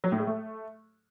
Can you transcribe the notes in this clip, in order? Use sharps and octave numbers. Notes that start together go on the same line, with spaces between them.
F#3
A2
G#3
A3